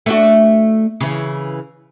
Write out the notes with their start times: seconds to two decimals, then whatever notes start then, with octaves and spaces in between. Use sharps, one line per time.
0.06 A3 D4 F#4
1.00 C#3 E3